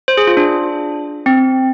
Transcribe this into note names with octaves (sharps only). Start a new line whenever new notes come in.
C5
G#4
F4
D4
C4